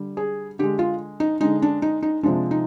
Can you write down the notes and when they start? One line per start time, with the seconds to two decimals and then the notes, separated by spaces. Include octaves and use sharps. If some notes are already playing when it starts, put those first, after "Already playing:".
Already playing: D3 G3
0.17 G#4
0.59 D3 G#3 G4
0.79 F4
1.20 D#4
1.41 D3 G#3 D#4
1.62 D4
1.82 D#4
2.03 D#4
2.23 C3 F3 G#3 D4
2.51 D#4